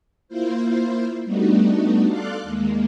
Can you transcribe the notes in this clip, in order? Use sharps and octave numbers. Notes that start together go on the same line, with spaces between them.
A#3 E4 F4 C5
G3 A3 B3 D4 D#4 F#4
A4 D5 F5 C6 D6 F#6
D#2 G#3 A#3